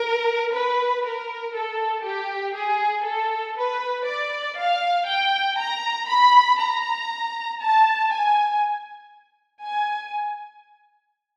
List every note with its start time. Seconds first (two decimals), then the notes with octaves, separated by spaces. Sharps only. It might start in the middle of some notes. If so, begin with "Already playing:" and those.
Already playing: A#4
0.54 B4
1.05 A#4
1.56 A4
2.06 G4
2.56 G#4
3.06 A4
3.57 B4
4.07 D5
4.58 F5
5.08 G5
5.60 A#5
6.10 B5
6.61 A#5
7.61 A5
8.12 G#5
9.63 G#5